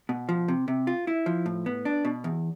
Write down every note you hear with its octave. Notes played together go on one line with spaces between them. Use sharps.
B2
F3
C3
C3
F4
E4
F3
A2
B3
D4
B2
E2